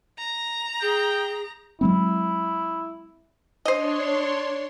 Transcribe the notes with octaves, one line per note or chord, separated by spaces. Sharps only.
A#5
G#4 G5
F#3 G#3 C4 E4
D4 C5 C#5 D#5 C6